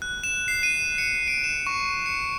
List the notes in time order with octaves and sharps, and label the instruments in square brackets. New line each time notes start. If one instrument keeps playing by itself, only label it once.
[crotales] F#6
E7
C7
D#7
C#7
D7
E7
C#6
C#7